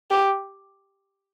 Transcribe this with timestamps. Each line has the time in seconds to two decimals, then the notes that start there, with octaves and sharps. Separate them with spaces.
0.11 G4